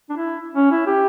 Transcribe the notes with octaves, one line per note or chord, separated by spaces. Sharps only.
D4
E4
C#4
E4
G4